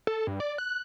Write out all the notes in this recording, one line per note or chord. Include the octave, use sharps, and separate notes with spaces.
A4
G2
D5
F#6